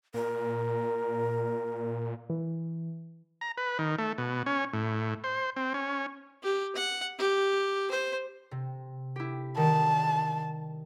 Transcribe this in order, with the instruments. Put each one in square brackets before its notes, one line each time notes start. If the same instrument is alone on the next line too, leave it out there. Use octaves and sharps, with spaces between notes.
[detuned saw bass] A#2 [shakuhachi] A#4
[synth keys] E3
[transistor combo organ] A#5
B4
D#3
A3
B2
C#4
A2
C5
C4
C#4
[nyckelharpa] G4
F#5
G4
C5
[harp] C3
E4 G4
[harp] D#3 G3 [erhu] A5